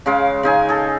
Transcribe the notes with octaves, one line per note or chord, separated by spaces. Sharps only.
C#3 G#3 F5
C#3 D#4 G#5
G#4 A4